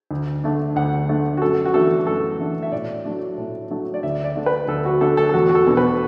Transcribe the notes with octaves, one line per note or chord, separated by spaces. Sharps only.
D2
D3 A3 D4
D2 F#5
D3 A3 D4
F#4
F#2 A4
F#4
E3 A3 D4 A4
F#2 A4
E3 A3 D4
E5
A2 D5
F#3 A3 D4
A2
F#3 A3 D4
D5
D2 E5
D5
D3 A3 D4
B4
D2 A4
F#4
D3 A3 D4 A4
A4
A4
E2 F#4
F#4
A4
B2 B3 D4
B4